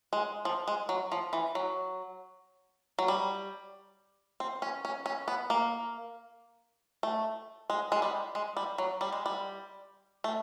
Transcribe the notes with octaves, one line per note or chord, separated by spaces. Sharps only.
G#3
F3
G#3
F#3
F3
E3
F#3
F#3
G3
C4
C#4
C#4
C#4
B3
A#3
A3
G#3
G#3
G3
G#3
G3
F#3
G3
G#3
G3
A3